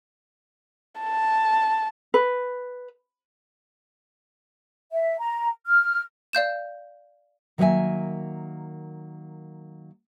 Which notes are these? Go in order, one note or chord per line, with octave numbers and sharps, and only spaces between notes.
A5
B4
E5
A#5
F6
D5 F5 G6 E7
D#3 F#3 A#3 D#5 E5 G#5